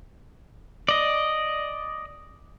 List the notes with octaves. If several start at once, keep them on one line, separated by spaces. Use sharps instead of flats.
D5 D#5